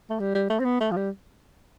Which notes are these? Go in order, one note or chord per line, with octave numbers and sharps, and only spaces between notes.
A3
G3
G3
A3
C4
B3
A3
F3
G3